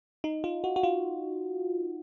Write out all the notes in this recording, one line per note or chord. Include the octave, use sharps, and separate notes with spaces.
D#4
F4
F#4
F#4
F4